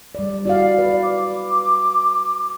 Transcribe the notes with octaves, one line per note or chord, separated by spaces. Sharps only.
G3 D5
E4 F#4 D5 F5
B4
D6